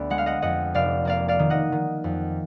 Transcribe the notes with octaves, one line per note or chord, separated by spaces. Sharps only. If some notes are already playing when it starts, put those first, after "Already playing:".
Already playing: D2 B3 D5
G#3 F#5
F5
D#5 F#5
F2 D#5 F#5
F1 D5 F5
A#3 D5 F5
D5 F5
D#3
D#5 F#5
D#3
F2